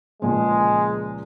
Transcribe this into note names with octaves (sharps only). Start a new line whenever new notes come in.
C#2 A#2 F3 G#3